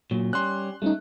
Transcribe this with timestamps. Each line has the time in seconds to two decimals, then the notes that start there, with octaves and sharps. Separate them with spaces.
0.11 A#2 F#3
0.33 G3 C#4 C6 F#6
0.82 G3 A3 C#4 D#4